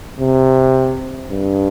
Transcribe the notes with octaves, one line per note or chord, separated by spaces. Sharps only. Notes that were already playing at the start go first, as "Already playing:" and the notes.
C3
G2